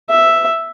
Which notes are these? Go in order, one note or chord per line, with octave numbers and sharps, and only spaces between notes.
E5